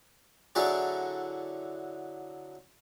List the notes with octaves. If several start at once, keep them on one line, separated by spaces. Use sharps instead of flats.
D3 F#3 E4 F#4 G#4 D5